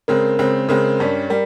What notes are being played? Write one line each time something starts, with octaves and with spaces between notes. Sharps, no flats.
C#3 G#3 C4 A#4
C#3 G#3 C4
C#3 G#3 C4 A#4
G2 G3 C#4
G3 A#4